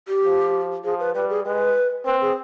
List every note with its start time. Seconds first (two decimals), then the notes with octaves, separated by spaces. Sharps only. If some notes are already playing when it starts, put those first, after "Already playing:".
0.08 G4
0.24 F3
0.84 F3 G#4
1.00 B4
1.14 G3 B4
1.30 G#4
1.45 G#3 B4
2.06 C4 B4
2.21 G#4